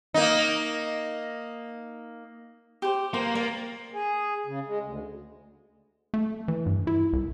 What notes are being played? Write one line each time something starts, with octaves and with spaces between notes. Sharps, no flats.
A#3 D#4
G4 C5
A#3 C5
A#3 D5
G#4
C#3
G#3
D2
A3
E3
G2
E4
C2